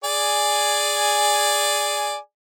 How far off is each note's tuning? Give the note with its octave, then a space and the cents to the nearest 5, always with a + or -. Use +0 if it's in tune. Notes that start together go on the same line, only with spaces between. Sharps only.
G#4 +0 D5 +0 G#5 +0